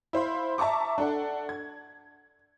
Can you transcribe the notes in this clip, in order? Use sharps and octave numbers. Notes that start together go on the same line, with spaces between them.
E4 C5 F5 B5
E5 A5 A#5 C#6 D6
D4 A4 F#5
G#6